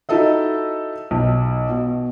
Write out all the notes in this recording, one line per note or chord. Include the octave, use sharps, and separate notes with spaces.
D#4 E4 F#4 A4 D#5 E5
B1
B2